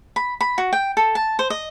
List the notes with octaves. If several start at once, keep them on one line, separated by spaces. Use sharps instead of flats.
B5
B5
F#4
G5
A4
A5
C5
D#5